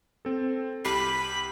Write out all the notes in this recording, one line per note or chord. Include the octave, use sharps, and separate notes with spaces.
C4 A4
C2 G4 B5 C7